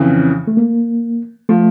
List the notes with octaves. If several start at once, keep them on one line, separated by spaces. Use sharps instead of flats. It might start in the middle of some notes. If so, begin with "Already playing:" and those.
Already playing: F2 C#3 E3 C4
A3
A#3
F3 A3